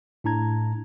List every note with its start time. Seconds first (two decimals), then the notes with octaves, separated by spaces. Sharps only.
0.24 A2 D4 E4 A5 A#5 G#6